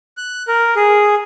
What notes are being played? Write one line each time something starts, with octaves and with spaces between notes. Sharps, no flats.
F#6
A#4
G#4